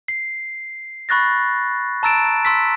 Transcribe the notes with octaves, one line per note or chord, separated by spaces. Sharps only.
C7
B5 C#6 F#6 A6 A#6
A5 A#5 E6 A6 D7 E7
C6 E6 B6